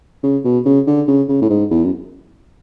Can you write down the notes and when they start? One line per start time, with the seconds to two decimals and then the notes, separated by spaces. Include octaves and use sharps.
0.23 C#3
0.44 B2
0.66 C#3
0.87 D3
1.08 C#3
1.29 C#3
1.42 A2
1.50 G#2
1.71 E2
1.84 F#2